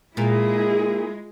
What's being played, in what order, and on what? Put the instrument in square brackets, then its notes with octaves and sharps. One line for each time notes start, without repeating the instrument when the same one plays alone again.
[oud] A#2 [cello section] G#3 [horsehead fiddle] E4 G#4